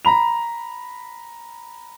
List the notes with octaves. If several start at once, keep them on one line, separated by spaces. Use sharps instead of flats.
A#5 B5 F7